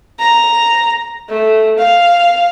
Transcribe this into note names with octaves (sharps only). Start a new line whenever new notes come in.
A#5
A3
F5